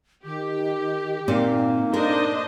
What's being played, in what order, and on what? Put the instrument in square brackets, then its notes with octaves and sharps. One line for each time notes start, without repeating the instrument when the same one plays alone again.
[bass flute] D#3 [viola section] G4
[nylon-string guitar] A#2 C4 D5 [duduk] A#3 [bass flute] D#4
[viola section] D4 C5 D#5 [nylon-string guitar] A#4